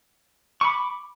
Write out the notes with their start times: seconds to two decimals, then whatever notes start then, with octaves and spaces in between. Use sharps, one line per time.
0.61 C#6
0.65 B5
0.68 D6